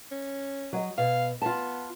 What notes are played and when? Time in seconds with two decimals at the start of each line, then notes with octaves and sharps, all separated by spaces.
0.11 C#4
0.73 F#3 D#5
0.98 B2 F5
1.42 B3 F4 A5